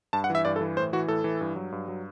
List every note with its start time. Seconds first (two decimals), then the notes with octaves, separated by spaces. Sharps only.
0.13 G2 A5
0.24 F#5
0.30 E3
0.35 E5
0.45 G2 D5
0.56 A4
0.61 E3
0.77 A2 C5
0.93 E3 F#4
1.08 A2 A4
1.24 E3
1.41 G2
1.56 F#3
1.72 G2
1.88 F#3